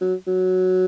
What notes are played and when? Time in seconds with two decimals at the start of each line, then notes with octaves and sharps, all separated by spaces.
0.01 F#3
0.27 F#3